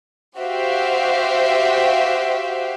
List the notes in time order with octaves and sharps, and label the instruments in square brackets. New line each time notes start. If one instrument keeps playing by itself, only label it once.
[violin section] F#4 G4 C5 E5 F5 G5